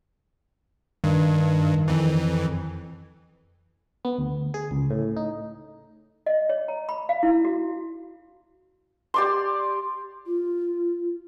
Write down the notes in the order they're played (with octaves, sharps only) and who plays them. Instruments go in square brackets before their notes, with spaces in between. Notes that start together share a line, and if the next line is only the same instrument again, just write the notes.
[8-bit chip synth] G2 [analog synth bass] D#3
[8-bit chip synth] F2 E3
[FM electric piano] B3
D2
G#4
C#2
A2
D#4
[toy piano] D#5
C#5
A#5
B5
F5
E4
F#4
[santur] G4 D5 C6
[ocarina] F4